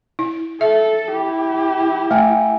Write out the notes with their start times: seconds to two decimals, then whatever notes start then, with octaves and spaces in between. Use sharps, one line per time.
0.19 E4
0.61 A4 E5
1.11 E4 G4
2.11 A3 E5 G5 G#5